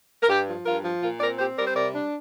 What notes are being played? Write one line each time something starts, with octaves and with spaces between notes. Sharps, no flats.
A#4
G2 G4
F3
G2 F4 A#4
F3
A#2 F4 A#4
C4 A#4 D5
C4 G4 C5
G3 A#4 D5
C5
C3 A#4 D5
D4